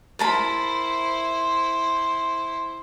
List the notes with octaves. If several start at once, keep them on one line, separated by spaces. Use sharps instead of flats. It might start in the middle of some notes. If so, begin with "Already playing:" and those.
E4 A#4 C5 A5 B5